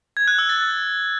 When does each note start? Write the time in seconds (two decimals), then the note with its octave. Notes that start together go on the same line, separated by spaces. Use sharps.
0.17 G#6
0.28 F#6
0.39 E6
0.49 A6